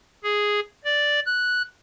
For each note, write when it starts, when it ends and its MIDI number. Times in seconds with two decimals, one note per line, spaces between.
0.24 0.60 68
0.84 1.20 74
1.26 1.62 90